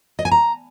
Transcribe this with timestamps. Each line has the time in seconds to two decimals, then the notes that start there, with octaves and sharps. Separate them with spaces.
0.19 D#5
0.25 G#5
0.31 A#5